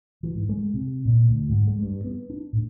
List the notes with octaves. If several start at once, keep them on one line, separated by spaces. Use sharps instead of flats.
E3
G#2
G#3
C3
A#2
D2
G#2
G#3
G2
B3
D4
A2